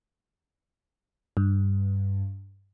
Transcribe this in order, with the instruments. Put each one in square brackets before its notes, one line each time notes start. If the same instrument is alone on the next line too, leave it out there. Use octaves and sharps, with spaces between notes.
[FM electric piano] G2